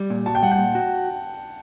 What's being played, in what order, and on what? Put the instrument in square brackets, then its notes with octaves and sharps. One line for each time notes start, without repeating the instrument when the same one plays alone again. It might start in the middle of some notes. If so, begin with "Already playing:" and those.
Already playing: [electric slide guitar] G3
A#2
[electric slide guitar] F#4 [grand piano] A5
[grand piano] G5
[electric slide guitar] G3 [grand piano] F#5
[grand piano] G5
[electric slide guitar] A#2
F#4